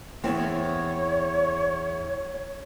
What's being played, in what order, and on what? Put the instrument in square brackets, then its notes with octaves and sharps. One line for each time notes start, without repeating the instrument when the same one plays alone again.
[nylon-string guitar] E2 C4 [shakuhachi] C#5